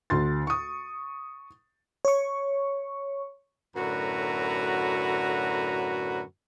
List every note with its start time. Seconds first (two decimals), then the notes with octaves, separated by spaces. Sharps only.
0.10 D2 C6 A6
0.47 C#6 D#6
2.05 C#5 C#6
3.76 F#2 A2 D3 F#4 B4 A#5